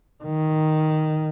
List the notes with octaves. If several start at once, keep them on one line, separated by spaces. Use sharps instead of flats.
D#3